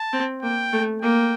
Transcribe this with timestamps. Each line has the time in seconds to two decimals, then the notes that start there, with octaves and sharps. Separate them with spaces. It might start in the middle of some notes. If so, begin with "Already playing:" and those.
Already playing: A5
0.13 C4
0.43 A#3 G5
0.73 A3
1.02 A#3 G5